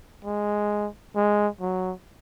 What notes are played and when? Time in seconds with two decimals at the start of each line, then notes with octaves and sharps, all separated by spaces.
0.25 G#3
1.16 G#3
1.61 F#3